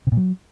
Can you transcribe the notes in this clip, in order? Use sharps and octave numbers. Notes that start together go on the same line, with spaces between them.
C3
A#2
F#3